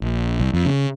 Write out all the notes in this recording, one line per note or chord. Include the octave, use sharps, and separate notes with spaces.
A#1
C2
F2
C#3